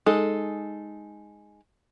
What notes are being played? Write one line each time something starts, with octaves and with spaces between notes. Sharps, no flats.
G#3 D#4 A4